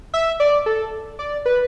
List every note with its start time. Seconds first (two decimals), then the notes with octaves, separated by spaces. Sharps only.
0.14 E5
0.40 D5
0.66 A4
1.19 D5
1.46 B4